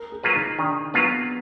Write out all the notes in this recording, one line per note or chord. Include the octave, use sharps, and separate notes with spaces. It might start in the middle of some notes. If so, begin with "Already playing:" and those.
Already playing: A#4
G#4
F#3 A#3 F4 B4
D#4
D#3 D4
F#3 A#3 B3 F4 B4